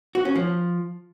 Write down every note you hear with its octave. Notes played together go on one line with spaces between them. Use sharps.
F#4
C#4
F3